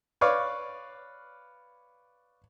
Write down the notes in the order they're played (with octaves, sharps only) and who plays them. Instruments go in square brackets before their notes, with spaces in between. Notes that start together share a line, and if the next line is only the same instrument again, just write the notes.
[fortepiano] B4 C#5 D5 F5